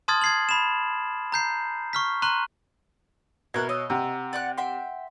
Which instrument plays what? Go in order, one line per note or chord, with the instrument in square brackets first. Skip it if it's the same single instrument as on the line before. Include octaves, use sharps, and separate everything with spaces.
[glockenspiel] A5 C6 D#6 F6 G#6 A6
G#6 C7 F#7
B5 E7
A#5 G6 C7
C#6 F6 B6
A#5 C6 C#6 F#6 D#7
[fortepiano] B2 F#6 [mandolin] E4 A#4 [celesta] G#6
[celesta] C#5 D#6 E6 [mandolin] D#5
[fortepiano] C3 [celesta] F#5 A#5 E6
[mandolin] D5 F#5 F#6
[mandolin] E5 G5 C6 [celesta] F#5